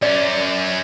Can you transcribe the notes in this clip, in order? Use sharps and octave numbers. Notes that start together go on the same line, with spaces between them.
F#2 C#4 D5